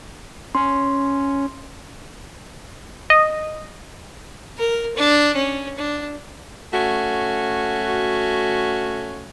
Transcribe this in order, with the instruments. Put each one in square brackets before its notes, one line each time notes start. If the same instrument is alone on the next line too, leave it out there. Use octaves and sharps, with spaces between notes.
[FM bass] C#4 [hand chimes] C6
[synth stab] D#5
[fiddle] A#4
D4
C#4
D4
[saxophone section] A3 C#4 F#4